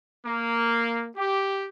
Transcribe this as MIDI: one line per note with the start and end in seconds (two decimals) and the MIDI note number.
0.24 1.08 58
1.16 1.66 67